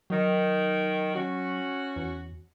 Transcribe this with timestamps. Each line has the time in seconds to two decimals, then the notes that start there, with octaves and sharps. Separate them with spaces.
0.10 D#3 F#3
1.15 C#4 F#4
1.96 E2